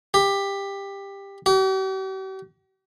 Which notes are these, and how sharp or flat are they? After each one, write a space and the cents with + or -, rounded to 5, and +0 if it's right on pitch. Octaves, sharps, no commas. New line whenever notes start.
G4 +15
G4 -45